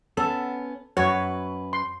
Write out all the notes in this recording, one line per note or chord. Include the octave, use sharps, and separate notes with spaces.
B3 C#4 A4
F#2 F#4 B4 C#5
C6